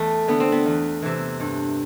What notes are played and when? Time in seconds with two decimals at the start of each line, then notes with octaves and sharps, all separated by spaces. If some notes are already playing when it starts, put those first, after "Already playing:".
Already playing: E2 A3
0.28 D3 B3
0.40 C4
0.52 B3
0.66 E2
1.02 C3 E3
1.40 G2